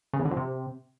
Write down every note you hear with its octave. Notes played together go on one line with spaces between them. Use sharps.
C#3
E2
D3
F2
C3